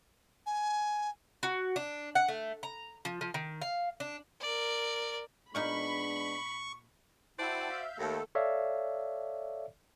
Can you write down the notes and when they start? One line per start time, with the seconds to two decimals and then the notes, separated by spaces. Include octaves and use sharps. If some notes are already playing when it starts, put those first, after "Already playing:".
0.46 G#5
1.43 F#4
1.76 D4
2.15 F#5
2.28 A3
2.63 A#5
3.05 F3
3.21 F3
3.34 D#3
3.61 F5
4.00 D4
4.41 A#4 D5
5.55 A#2 G#3 A#3 B3 D4 D#4 B5 C#6
7.39 E4 F#4 C5 D5 G5 A5
7.70 E5 F5 G6
7.98 D#2 A3 A4
8.35 A4 C#5 D5 E5 F5